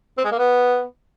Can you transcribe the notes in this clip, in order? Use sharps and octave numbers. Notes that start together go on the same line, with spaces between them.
C4
G#3
A#3
B3